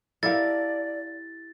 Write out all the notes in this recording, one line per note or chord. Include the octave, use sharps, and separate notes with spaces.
E4 G4 A4 A#4 D5 F5 A6